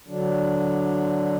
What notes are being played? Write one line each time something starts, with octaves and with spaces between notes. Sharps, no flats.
D3 F#3 D4